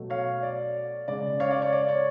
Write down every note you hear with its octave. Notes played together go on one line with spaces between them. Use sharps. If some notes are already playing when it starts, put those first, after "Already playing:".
Already playing: B2 F#3 A3
C#5 F5
D5
C#3 G#3 C#4 D5
C#5 F5
D5
C#5
D5
C#5